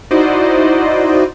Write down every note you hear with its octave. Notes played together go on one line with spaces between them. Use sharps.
D#4 E4 F#4 C5 D5 D#5